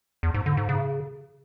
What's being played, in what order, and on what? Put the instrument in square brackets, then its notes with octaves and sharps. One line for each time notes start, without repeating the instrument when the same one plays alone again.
[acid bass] E2
G#2
D3
G#2
C#3